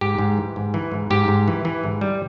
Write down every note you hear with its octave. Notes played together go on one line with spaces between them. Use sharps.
G#2 G4
G#2
E3
G#2
E3
G#2
G#2 G4
G#2
E3
E3
G#2
G3